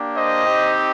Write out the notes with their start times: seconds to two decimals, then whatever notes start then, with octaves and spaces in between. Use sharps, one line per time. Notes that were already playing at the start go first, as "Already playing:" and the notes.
Already playing: A#3 D4 G4
0.15 C5 D#5
0.45 C4 D#4 G4